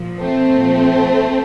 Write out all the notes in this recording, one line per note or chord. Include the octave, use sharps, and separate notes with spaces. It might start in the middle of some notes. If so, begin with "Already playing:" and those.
Already playing: A#2 F3
A3 C4
A#2 F3